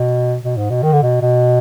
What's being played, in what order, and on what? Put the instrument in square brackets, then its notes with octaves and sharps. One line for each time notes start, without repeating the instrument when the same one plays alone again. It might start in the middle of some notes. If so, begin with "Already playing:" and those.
Already playing: [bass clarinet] B2
B2
G#2
B2
D#3
D3
B2
B2